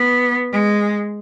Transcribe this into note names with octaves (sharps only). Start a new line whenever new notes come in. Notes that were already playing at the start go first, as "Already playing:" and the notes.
Already playing: B3
G#3